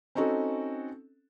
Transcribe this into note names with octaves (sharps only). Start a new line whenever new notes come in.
C4 C#4 D#4 F#4 A4